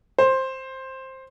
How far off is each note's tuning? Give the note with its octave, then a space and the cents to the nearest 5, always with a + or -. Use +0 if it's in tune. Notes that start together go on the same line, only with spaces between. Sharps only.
C5 +10